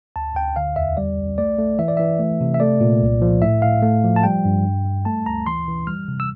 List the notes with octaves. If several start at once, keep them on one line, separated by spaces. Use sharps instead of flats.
D2 A5
D2 G5
D3 F5
E2 E5
G3 D5
C2
A3 D5
A3
E3 E5
D5
E3 E5
A3
C3
E5
A3 D5
A#2
C2
F3
A2 E5
A2 F5
A3
F3
A5
G3 G5
G2
G2
G3
A3 A5
D2 A#5
E3 C6
E3
G3 F6
C3
E6